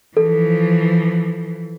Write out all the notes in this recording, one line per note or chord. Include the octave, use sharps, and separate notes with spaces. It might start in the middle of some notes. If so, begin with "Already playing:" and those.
E3 F3 A4